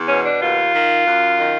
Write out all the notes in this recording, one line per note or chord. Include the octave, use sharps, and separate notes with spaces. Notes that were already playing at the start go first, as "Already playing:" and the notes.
Already playing: E2
B2 C#4
D4
D#2 F4
D#3
F#2
D#3